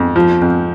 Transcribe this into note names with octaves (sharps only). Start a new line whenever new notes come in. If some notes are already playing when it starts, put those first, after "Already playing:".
Already playing: F2
F3
F2